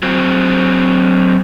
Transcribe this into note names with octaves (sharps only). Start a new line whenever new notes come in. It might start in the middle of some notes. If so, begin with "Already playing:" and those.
F#3 C4